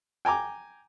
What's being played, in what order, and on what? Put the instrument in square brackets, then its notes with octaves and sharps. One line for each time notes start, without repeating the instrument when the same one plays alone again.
[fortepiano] G5 G#5 A#5 D6